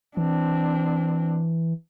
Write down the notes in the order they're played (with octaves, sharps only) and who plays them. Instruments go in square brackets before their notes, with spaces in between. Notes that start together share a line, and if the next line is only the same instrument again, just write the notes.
[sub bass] E3 [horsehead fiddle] C4 D4